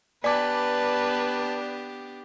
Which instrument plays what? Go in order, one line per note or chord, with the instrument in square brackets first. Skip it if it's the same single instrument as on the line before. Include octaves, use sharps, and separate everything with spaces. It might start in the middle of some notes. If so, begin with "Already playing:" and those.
[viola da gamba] B3 D4 G4 [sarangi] B4 [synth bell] D5 D6 [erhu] A5